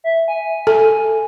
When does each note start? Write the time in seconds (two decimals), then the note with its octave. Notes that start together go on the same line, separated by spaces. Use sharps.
0.04 E5
0.28 G#5
0.67 A4